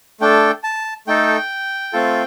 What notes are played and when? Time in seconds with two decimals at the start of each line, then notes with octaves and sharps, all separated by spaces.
0.20 A3 D4 A4 G5
0.64 A5
1.07 A3 D#4 A4 G5
1.93 A3 C4 F4 A4